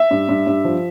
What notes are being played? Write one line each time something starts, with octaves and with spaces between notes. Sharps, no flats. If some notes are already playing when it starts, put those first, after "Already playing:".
Already playing: E5
G2
G2
G2
F3